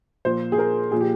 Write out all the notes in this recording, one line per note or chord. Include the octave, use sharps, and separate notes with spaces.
A#2 F3 C5
G#4
A#4
A#2 F3 G#4
G4